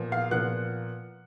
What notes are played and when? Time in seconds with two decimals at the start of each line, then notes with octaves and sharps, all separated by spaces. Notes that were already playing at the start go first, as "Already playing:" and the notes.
Already playing: A#2 F3 B3
0.12 F5 F6
0.31 A#2 F3 B3 F#5 F#6